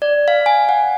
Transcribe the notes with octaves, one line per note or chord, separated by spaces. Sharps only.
D5
F5
G#5
F#5